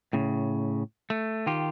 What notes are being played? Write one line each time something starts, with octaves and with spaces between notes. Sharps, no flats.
A2 C#3
A3
D#3 F4 G4